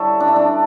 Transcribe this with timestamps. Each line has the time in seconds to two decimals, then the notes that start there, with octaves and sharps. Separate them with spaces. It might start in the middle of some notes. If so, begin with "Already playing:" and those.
Already playing: D3 G3 E4 A4 C#5
0.20 D4
0.28 E4
0.36 D4